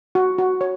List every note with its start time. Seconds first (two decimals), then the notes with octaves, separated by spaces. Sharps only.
0.15 F#4
0.38 F#4
0.61 C#5